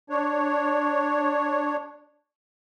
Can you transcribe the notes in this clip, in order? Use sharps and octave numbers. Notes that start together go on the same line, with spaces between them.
D4 C#5